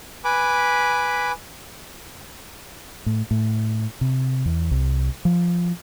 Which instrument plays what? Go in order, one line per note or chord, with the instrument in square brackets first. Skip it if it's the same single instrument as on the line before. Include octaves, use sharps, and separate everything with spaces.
[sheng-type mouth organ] B4 G#5 B5 D6
[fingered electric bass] A2
A2
C3
E2
C2
F3